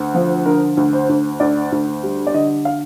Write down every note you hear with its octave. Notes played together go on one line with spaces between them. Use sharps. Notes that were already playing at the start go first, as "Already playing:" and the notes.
Already playing: D2
F3
D3 A#4
D2
C5
D2
D2 D5
D2
G3
D5
D3 D#5
F5